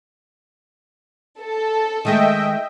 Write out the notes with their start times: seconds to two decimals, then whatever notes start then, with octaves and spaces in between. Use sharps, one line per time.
1.41 A4
2.05 D#3 G#3 A3 D#5 E5 G5